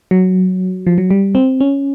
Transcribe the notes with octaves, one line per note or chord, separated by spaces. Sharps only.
F#3
F3
F#3
G3
C4
C#4